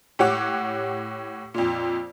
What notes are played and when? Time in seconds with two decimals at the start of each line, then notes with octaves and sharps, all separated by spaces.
0.19 A2 G4 C#5 F#5 D6
1.54 F2 A#2